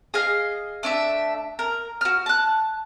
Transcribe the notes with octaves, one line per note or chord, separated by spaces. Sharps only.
G#4 D#5 F5
A3 D4 E5
A#4
F#4 F6
A5 F#6